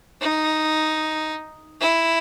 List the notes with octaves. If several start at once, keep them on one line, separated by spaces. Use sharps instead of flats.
D#4
E4